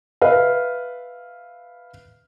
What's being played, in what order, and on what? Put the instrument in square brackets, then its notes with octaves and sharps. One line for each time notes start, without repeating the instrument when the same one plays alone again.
[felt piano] B4 E5 F5